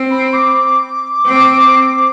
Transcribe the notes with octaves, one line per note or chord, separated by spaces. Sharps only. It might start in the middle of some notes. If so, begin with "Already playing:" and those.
Already playing: C4
B5
D6
D6
C4